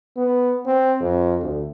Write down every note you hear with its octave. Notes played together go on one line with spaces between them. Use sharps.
B3
C4
F2
D2